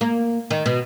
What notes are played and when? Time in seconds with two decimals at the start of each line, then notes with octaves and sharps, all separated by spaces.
0.01 A#3
0.51 D#3
0.66 B2